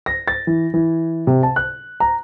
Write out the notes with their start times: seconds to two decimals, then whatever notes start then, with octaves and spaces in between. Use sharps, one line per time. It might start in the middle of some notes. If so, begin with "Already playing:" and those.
0.06 A#6
0.28 A6
0.47 E3
0.74 E3
1.27 C3
1.43 A5
1.56 F#6
2.00 A#5